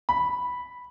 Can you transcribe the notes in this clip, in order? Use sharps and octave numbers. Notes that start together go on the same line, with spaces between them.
B5